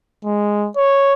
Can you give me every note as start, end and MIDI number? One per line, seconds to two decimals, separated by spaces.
0.25 0.68 56
0.76 1.14 73